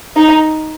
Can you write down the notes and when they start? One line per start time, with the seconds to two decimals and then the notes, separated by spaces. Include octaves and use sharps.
0.16 D#4